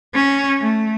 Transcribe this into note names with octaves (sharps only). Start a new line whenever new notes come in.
C#4
A3